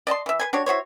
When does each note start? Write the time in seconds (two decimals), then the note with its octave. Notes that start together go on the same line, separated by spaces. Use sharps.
0.07 D5 D#5 A5 C6
0.26 E3 E5
0.39 B4 C5 G#5
0.53 D4 F#4 G4 C#5
0.66 E4 F#4 C5 C#5